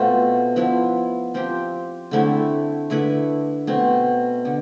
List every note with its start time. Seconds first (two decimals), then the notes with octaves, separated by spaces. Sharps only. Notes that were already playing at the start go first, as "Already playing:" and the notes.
Already playing: B2 A3 C4 F4
0.56 F3 B3 E4
1.34 F3 C4 G4
2.11 D3 A3 C4 E4
2.90 D3 A3 E4 B4
3.67 B2 A3 C4
4.45 D3